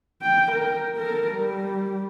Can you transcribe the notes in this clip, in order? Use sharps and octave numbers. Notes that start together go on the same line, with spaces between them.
G5
A#4
A4 A#4
G3